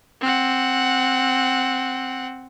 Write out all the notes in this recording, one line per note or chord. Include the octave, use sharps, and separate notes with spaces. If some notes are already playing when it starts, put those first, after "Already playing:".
C4 F#5